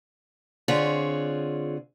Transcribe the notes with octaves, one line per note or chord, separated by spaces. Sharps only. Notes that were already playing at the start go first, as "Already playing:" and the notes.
D3 C4 F4 G#4 C#5